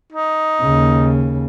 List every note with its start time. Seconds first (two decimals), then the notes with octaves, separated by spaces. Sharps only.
0.12 D#4
0.62 D#2 C#3